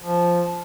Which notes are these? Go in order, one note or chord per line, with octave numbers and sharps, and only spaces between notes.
F3